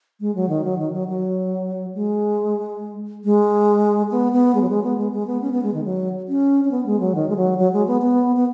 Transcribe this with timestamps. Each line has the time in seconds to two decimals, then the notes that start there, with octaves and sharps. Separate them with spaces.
0.21 G#3
0.35 F#3
0.49 D#3
0.64 F#3
0.79 D#3
0.93 F#3
1.08 F#3
1.95 G#3
3.25 G#3
4.11 B3
4.33 B3
4.55 G#3
4.62 F#3
4.70 G#3
4.83 B3
4.98 G#3
5.12 G#3
5.27 B3
5.42 C#4
5.52 B3
5.63 G#3
5.74 D#3
5.85 F#3
6.29 C#4
6.65 C#4
6.71 B3
6.86 G#3
7.00 F#3
7.15 D#3
7.29 G#3
7.36 F#3
7.58 F#3
7.73 G#3
7.87 B3
8.02 B3
8.36 B3